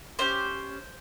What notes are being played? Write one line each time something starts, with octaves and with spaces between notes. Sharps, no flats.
C#4 G4 C5